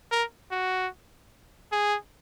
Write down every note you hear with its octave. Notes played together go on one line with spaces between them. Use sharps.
A#4
F#4
G#4